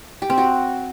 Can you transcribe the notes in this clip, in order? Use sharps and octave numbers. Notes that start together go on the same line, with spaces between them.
G4
C4
F#4